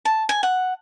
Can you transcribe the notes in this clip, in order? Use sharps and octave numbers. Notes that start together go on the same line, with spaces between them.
A5
G#5
F#5